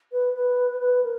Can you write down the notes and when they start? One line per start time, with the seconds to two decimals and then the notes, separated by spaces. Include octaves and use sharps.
0.12 B4
0.34 B4
0.80 B4
1.03 A#4